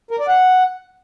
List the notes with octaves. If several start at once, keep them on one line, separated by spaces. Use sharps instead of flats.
A#4
D5
F#5